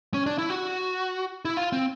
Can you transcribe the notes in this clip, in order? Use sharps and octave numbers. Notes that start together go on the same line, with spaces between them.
C#4
D4
E4
F#4
E4
F4
C4